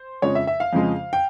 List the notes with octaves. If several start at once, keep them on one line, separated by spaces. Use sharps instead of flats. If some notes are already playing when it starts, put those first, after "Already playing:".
Already playing: C5
F2 C#3 F3 G#3 C#5
E5
E5
F5
F2 C#3 F3 G#3
G5